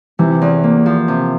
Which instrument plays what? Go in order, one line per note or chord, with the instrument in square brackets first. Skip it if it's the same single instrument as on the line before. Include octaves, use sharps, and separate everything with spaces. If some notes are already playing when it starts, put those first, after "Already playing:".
[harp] C3 [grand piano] E3
[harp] E2
A#3
F3
C3